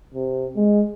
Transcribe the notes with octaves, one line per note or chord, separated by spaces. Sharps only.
C3
G#3